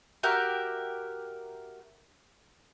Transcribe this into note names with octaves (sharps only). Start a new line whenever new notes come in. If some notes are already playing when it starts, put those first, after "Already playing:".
F#4 G4 A#4 E5